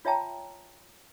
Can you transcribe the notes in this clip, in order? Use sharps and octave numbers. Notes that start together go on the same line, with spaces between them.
F4 C#5 E5 G5 A5 A#5